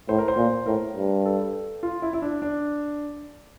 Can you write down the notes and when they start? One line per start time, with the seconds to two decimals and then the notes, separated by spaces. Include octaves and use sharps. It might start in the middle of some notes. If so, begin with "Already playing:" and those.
0.08 A2 C5
0.18 A#4
0.28 C5
0.37 A#2
0.66 A2 A#4
0.96 G2
1.25 A4
1.83 F4
2.02 E4
2.13 E4
2.22 D4
2.42 D4